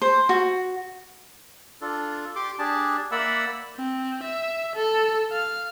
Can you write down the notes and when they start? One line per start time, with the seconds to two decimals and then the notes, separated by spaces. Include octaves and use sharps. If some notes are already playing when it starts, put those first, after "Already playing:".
0.02 C5
0.29 F#4
1.81 D4 F4 A4
2.36 G4 C6 D6
2.59 D4 G4 G#4 A5
3.12 A#3 D5 E5 F#5 B5 E6
3.75 C4
4.23 E5
4.75 A4
5.32 F5